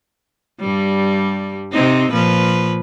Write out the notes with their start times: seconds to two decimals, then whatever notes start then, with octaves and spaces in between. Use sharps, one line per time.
0.60 G2 G3
1.72 C3 C4 D#4
2.12 A#2 F3 B4